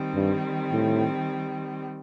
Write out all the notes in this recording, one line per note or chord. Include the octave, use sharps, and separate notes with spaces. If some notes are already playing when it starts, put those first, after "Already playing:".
Already playing: D#3 G3 C4
G2
A2